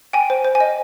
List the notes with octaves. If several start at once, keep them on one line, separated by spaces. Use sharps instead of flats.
G5 G#5
C5
C5
G#5
D#5